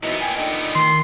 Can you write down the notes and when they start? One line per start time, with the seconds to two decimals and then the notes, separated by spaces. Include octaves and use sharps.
0.03 A#2 E3 F#3 B3 D#4
0.21 G5 G#5
0.37 D3 D#4 G5
0.75 D#3 C6